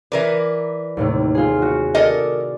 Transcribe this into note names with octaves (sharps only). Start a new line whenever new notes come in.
E3 A#4 B4 D5
D#2 A2 C3
F4 G#4
F#4
A4 A#4 D5 D#5 A6